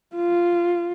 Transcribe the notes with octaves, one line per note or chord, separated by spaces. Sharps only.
F4